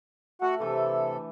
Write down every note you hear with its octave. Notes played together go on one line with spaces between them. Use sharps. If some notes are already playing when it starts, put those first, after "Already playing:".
A3 F#4 F#5
C3 E3 A3 D4 A4